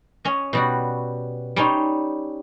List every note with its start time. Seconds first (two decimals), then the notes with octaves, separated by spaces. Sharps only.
0.25 C#4 D#5
0.53 B2 G3 F#4
1.56 G3 C#4 D#4 C6